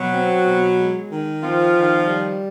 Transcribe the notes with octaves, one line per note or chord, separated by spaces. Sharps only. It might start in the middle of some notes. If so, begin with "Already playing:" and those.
Already playing: B2 F#3 F#4
C4
B2
G#3
D#3
F3 C4 F4
D#3
G3